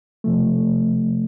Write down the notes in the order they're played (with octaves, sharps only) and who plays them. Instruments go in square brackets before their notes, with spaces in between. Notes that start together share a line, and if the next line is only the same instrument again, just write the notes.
[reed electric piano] C3 F3 A3